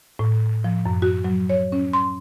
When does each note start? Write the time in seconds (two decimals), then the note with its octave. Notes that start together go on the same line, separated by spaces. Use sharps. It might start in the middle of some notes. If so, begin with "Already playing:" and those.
0.19 A2
0.64 F3
0.86 F#2
1.02 F#4
1.25 F#3
1.50 C#5
1.72 C#4
1.93 C6